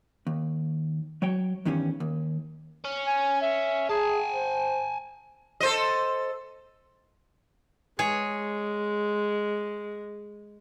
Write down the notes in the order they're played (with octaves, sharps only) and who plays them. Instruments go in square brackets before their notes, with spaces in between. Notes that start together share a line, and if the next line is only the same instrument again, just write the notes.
[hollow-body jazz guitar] D#2
F#3 C#5 G5
E2 G2 D#3 G3 C#4
D#2
[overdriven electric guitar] C#4
[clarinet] G#5
E5
[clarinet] G#4 [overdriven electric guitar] G#5 A5
[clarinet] C5
[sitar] A4 C5 D#5
[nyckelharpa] G#3 [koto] G#4 C#5